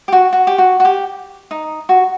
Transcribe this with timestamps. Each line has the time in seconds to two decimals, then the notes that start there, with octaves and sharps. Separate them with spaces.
0.08 G4
0.12 F#4
0.33 F#4
0.47 G4
0.58 F#4
0.80 F#4
0.85 G4
1.51 D#4
1.89 F#4